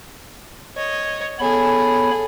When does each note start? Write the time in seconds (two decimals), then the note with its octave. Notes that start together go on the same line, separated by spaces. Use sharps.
0.77 C#5 D#5
1.39 B3 G#4 A4 C#5 B5